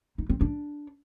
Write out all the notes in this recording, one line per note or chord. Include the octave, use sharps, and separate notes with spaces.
D#4
C4
D4